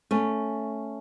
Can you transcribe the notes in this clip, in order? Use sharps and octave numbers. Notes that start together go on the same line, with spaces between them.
A3 C#4